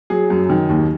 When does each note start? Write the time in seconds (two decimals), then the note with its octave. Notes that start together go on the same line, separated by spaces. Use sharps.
0.10 F#3 G#4
0.30 F#2
0.50 D#3
0.69 D#2